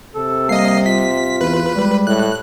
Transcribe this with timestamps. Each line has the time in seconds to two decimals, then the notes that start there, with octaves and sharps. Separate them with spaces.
0.15 C3 A4
0.49 G3 A#3 D#5 C7
0.86 F4 B6
1.41 E2 B4
1.75 G3 G#3
2.07 A2 F#6